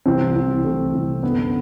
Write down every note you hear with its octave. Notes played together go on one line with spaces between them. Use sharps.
C2 C3 E3 C4
C2 C3 E3
C2 C3 E3 A3
C2 C3 E3
F#2 D3 B3
B3